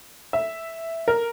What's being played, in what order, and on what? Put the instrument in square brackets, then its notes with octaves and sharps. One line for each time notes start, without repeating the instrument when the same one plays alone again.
[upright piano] E5
A#4